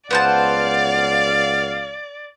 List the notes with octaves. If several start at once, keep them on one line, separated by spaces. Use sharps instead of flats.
C#2 B3 C5 D5 F5 A5